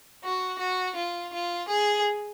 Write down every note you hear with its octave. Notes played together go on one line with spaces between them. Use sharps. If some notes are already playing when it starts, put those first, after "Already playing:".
F#4
F#4
F4
F4
G#4